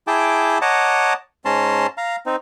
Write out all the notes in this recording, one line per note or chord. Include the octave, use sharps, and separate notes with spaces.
E4 G#4 G5 A5 D6
C#5 D#5 F#5 A5 A#5 D6
G#2 C#4 A5 A#5 C6
F5 A#5
C4 D#4